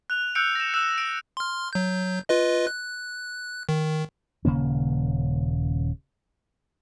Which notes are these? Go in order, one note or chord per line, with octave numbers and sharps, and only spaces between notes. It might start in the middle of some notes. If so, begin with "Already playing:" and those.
F#6 F7
E6 F#6 G6 C#7 D7 F7
A#6 E7
E6 F#6 C#7 E7
D7
C6 F6
F#3 G6
F4 B4 D#5
F#6
D#3
D#1 C#3 A#3 C#4